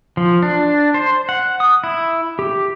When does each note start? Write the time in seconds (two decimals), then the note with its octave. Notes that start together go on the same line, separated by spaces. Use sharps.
0.17 F3
0.43 D4
0.94 C5
1.29 F#5
1.60 D#6
1.84 E4
2.39 G4